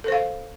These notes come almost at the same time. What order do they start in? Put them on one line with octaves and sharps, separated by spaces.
A4 C5 F5